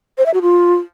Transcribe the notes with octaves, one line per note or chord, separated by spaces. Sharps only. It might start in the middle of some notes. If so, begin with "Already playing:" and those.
C5
E5
F#4
F4